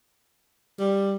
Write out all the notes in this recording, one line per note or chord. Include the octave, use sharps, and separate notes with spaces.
G3